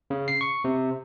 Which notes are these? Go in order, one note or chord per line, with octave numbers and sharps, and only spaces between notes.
C#3
C7
C#6
C3